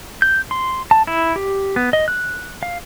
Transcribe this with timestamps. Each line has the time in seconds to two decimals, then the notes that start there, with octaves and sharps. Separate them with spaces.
0.22 G6
0.51 C6
0.91 A5
1.07 E4
1.36 G4
1.76 B3
1.93 D#5
2.08 F#6
2.63 F5